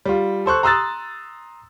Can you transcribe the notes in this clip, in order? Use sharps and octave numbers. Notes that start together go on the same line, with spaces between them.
G3 F4
A4 C5 C#6 F#6
A#5 C6 D#6 E6 F#6 A6